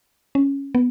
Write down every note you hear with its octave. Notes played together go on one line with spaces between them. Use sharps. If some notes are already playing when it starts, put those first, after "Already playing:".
C#4
B3